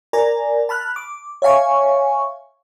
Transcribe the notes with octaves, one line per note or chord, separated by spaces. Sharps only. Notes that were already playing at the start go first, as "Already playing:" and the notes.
A#4 D5 G#5 A#5
A5 B5 F6 F#6
D6
C#5 E5 F5 G#5 C#6